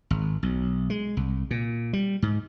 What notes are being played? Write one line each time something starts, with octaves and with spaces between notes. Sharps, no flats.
G#1
B1
G#3
C2
A#2
G3
G#2